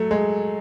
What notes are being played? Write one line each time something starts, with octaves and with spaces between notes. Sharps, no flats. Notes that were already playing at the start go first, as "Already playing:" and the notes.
Already playing: F#3 A3
G#3